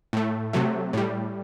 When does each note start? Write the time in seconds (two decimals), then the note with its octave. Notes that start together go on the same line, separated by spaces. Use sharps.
0.13 A2 A3
0.53 C3 F#3 A3
0.93 A2 G3